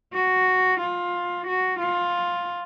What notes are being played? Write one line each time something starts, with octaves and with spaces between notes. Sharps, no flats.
F#4
F4
F#4
F4